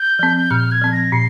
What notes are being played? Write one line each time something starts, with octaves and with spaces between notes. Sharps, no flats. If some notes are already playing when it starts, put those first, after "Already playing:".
Already playing: G6
F3 C4
A#2 F6
G#6
F3 C4
A#6
A#2 C7